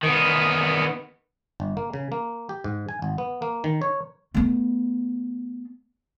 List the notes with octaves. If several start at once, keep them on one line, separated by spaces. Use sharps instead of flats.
D#3 B3
G1
A#3
C#3
A#3
G4
G#2
G#5
G#1
B3
A#3
D#3
C#5
A3 B3